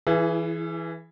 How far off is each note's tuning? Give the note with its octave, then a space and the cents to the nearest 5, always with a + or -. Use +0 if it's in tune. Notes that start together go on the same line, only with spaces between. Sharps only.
E3 +0 E4 +40 G#4 +20